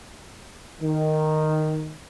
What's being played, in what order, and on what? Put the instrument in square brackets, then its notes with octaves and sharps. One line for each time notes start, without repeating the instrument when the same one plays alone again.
[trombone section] D#3